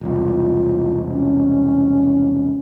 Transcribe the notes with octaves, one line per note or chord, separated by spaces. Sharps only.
E1 C2 F4
C#4